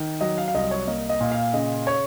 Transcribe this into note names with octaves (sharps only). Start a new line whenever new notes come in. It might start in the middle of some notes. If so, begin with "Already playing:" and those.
Already playing: D#3
F#3 D#5
F5
F5
C2 D#5
C#5
A#3 D#5
D#5
A#2
F5
C#3 D#5
C#5